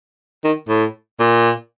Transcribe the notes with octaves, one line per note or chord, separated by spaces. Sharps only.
D#3
A2
A#2